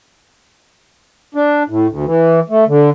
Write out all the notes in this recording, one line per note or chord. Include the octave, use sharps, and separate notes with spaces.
D4
A2
D2
E3
A3
D3